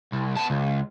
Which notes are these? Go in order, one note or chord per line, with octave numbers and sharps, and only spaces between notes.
C2
B3 A5
C#2